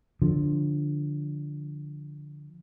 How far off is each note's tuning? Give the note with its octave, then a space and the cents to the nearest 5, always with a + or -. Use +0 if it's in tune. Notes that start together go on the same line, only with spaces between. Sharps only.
D3 +0 F3 +0